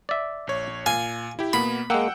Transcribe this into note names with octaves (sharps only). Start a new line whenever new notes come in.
D5 E5
A#1 C#5
A#2 F5 G#5
E4 G4
B2 A#3 B3 B5
G#3 A#3 F#5 G5 E6